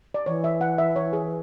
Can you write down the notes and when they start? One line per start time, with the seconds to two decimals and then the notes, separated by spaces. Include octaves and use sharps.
0.14 D5
0.26 E3 C#5
0.44 E5
0.61 F#5
0.78 E5
0.96 C#5
1.13 G#4